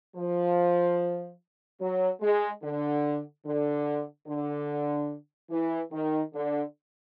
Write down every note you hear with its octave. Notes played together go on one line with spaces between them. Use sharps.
F3
F#3
G#3
D3
D3
D3
E3
D#3
D3